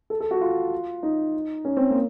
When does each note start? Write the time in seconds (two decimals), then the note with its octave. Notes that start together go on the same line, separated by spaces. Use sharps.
0.10 A4
0.20 A4
0.31 F#4
0.41 F4
1.03 D#4
1.65 C#4
1.77 C4
1.90 A#3